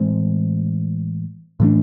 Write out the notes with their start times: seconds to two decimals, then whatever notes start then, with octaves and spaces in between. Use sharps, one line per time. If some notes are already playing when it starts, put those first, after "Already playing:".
Already playing: A2 E3 G#3 C4
1.60 A2 E3 A3 D4